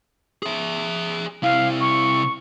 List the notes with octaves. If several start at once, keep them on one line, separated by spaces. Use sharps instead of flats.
G#4 E5
C3 E4 F5
C#6